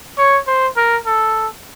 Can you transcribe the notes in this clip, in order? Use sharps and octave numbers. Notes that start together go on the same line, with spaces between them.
C#5
C5
A#4
A4